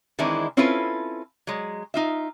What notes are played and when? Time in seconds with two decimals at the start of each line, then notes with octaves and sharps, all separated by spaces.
0.19 D#3 E3 G#3 C4 D4 E4
0.57 C4 C#4 E4 F4 A4 B4
1.47 F#3 G#3
1.94 D#4 F4 E5